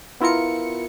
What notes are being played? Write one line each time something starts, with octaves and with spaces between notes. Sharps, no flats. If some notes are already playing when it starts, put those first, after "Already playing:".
B3 E4 F4 A#4 C#7